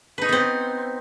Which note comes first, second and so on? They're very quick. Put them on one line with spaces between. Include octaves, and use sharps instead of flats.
B4 D#4 C#5 B3 C4